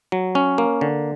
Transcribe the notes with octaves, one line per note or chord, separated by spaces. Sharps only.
F#3
C#4
A#3
D3